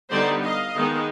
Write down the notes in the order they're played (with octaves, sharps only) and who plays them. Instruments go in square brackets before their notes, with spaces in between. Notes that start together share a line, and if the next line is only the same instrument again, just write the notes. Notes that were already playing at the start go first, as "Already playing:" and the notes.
[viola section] D3 G3 B3 D#4 C5 D5
D#5 F5
D#3 G#3 B3 D#4